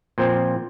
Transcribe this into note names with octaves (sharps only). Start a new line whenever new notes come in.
A#2 F3 C4